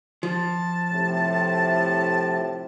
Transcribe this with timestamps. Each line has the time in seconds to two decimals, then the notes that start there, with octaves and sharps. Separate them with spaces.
0.23 F3 A5
0.92 A2 C3